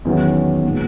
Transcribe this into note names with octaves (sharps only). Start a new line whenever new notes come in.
E2 D#3 F#3 C#4
A#2 G#3 B3